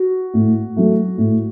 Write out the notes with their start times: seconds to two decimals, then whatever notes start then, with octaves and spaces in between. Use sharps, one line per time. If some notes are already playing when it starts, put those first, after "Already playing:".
Already playing: F#4
0.34 A2
0.77 F#3 A3
1.18 A2